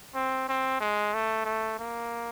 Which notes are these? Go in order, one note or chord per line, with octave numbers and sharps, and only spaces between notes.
C4
C4
G#3
A3
A3
A#3